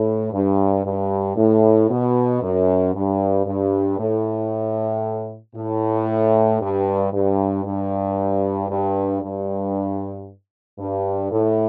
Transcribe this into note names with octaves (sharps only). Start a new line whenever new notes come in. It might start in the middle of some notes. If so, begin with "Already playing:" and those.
Already playing: A2
G2
G2
A2
B2
F#2
G2
G2
A2
A2
G2
G2
G2
G2
G2
G2
A2